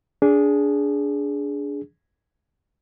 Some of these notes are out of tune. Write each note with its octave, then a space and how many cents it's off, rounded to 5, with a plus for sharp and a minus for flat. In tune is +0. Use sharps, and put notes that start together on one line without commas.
D4 -20 G#4 +0